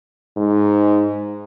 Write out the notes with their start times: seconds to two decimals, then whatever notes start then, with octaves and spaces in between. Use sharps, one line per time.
0.37 G#2